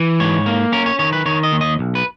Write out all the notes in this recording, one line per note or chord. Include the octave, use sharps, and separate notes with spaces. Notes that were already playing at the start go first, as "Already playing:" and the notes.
Already playing: E3
G#2 C#5
A#3
C#4 A#4
C#5
D#3 C#5
B4
D#3 C#5
D#5
D#2
D#5
B1
B4